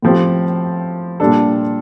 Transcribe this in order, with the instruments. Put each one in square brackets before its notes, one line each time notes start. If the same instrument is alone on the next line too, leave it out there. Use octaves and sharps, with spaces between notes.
[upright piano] A2 F3 C4 G4
A#2 G3 D4 A4